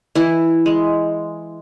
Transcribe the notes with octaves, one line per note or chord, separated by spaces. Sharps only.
E3 E4
G#3